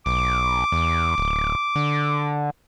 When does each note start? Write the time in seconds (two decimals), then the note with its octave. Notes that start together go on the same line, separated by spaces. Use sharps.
0.06 B1 D6
0.72 E2
1.18 D1
1.76 D3